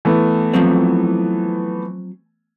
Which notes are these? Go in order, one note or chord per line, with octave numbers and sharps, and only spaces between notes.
E3 A3 B3
F3 F#3 C4